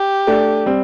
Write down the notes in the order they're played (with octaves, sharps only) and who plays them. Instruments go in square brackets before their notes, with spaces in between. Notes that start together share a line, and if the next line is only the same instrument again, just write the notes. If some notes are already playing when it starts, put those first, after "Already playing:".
Already playing: [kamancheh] G4
[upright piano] A3 D4
G3 C4